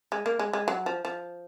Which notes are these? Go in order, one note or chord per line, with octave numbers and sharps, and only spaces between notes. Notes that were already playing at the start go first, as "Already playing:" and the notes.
G#3
A#3
G#3
G#3
F#3
F3
F3